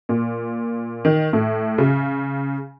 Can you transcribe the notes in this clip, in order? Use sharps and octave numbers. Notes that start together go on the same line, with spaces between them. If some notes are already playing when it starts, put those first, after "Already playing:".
A#2
D#3
A2
C#3